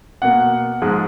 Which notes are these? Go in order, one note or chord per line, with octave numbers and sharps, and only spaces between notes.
B2 A#3 F#5
G#2 F3 G#3